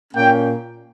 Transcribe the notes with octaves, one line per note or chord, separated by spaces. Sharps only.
A#2 A#3 C#4 G5